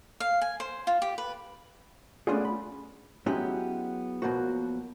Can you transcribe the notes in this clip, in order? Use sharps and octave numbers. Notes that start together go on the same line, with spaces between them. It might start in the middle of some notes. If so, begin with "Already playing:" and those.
F5
G#5
C5
F4
G4
B4
A3 B3 C#4 D4 F4 G#4
B5
F#3 G#3 B3 C#4 E4 G4
B1 B2 D#3 F3 A#3 F#4